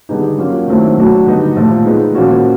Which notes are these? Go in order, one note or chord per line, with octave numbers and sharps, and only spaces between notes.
D3 G3 B3 D#4 G#4
F#3 A#3 C#4 F4
D#3 F#3 A3 C4 E4
B2 F#3 A3 D4 F#4
D3 G3 B3 D#4
A#2 F3 A3
G#3 B3 D#4
A#2 F3 A#3 C#4 F#4